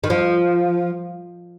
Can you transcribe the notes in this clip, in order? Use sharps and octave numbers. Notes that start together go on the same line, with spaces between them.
D#3
F3